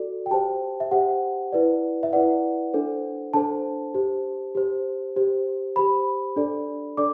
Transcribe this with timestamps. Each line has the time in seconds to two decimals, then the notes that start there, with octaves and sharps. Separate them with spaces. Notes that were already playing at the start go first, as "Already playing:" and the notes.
Already playing: F#4 A4 D5
0.26 G5
0.31 G4 C5 A5
0.80 E5
0.91 G4 C5 F#5
1.52 E4 B4 D5
2.03 E5
2.13 E4 B4 D5 F#5
2.74 D4 A4 C5
3.33 D4 A4 C5 A5
3.94 G4 C5
4.55 G4 C5
5.16 G4 C5
5.76 G4 C5 B5
6.36 D4 A4 D5
6.97 D4 A4 D5 D6